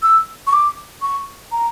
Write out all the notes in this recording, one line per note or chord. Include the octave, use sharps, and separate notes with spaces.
E6
C#6
D6
C#6
A#5